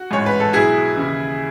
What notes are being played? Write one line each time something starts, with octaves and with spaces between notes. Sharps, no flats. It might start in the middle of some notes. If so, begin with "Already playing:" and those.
Already playing: F#4
A1 G#2 E3 C#5
B4
A4
B1 B2 F#3 E4 G#4
D#2 C#3 E3